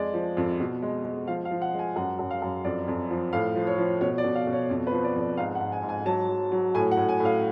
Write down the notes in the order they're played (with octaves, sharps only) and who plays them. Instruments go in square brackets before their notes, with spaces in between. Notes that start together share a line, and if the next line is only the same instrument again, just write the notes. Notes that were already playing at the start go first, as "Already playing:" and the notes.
Already playing: [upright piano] F2 G#3 D5
F3
F2
B2
G#3
G#3
F3 F5
F5
F3
F#5
G#3
G#5
F#2 F#5
F#2
F5
F#2
F2 D5
F2
F3
A2 F5
F3
C#5
F3
B2 C#5
D5
B2
F5
B2
C#5
F2
B4
F3
D5
F2
D5
G#2 F5
F#5
G#2
G#5
G#2
G#5
F#3 A5
F#3
F#3
A2 G#5
F#5
A2
G#5
A2
F5